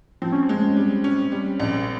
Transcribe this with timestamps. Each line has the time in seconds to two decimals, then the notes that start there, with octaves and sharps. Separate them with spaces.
0.22 F3 C4
0.32 C#4
0.43 C4
0.49 G#3
0.77 G3
1.04 C#4
1.32 G3
1.60 A#1